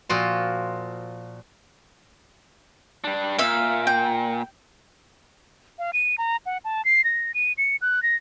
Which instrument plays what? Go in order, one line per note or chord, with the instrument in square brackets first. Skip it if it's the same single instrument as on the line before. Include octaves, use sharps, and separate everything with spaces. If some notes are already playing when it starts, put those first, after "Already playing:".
[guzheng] A#2 F3 F4 F#4
[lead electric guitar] G3 D4
[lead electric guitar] A#2 [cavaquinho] E5 F5
[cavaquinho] G5
[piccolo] F5
D#7
A#5
F#5
A5
C7
A#6
D#7
C#7
F#6
A#6